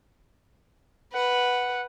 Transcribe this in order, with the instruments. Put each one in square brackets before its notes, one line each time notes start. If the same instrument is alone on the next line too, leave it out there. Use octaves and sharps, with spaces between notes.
[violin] B4 [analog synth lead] F#5